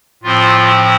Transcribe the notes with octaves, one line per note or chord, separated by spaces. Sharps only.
A2 F3 C4 F4